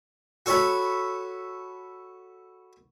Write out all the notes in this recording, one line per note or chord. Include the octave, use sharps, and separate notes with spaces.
F#4 A4 C#5 A5 B5